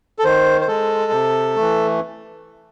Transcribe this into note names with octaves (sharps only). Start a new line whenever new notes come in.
A4
D#3 C5
C5
G#3 A4
C3
E3 A3